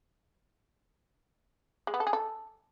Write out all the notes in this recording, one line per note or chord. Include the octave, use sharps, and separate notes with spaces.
G#3
B3
A4
G#4
A4